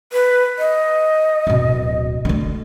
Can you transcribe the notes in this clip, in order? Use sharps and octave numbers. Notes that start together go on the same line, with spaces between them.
B4
D#5
D1 B2
D3 A3